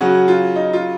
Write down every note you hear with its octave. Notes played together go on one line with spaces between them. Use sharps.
C#3 F#3 C#4 F#4
F4
D#4
F4